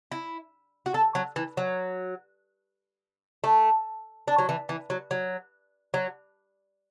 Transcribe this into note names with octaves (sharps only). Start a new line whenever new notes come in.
E4
F#4
A4
F#3
E3
F#3
A3
D4
F#3
E3
E3
F#3
F#3
F#3